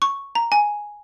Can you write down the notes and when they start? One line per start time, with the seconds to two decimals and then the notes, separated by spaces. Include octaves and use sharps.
0.02 C#6
0.35 A#5
0.52 G#5